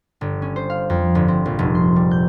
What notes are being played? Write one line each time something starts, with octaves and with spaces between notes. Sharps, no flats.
G1
C#4
C5
F5
F2
G1
C4
A#1
F1
C6
G3
G6